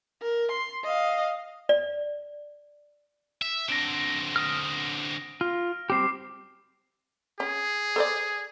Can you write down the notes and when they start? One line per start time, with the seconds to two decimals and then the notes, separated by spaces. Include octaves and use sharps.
0.22 A#4
0.51 C6
0.84 D#5 F5
1.69 D5
3.42 E5
3.69 D3 C4 A#6 D7
4.36 D#6 F6
5.41 F4 F6
5.90 G3 C4 G4 D6 C7
7.40 C#4 G#4
7.96 A4 C5 D5